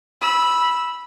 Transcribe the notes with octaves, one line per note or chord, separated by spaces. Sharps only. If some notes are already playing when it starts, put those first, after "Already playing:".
B5 E6